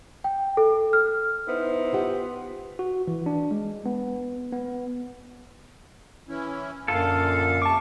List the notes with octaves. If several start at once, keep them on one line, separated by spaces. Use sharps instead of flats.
G5
A4
F6
B3 D#4 E4 C5
F4 G4 F#5
F#4
E3
D4
G#3
B3
B3
E3 C#4 E4
F#2 A#2 D3 F4 A4 F5
C3 A5 C#6 D6